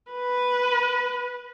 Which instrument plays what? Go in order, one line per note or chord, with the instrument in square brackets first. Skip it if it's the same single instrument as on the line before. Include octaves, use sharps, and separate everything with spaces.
[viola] B4